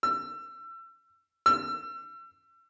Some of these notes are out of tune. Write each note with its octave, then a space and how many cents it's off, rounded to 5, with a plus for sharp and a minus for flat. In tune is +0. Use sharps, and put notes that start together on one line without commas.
E6 +30
E6 +35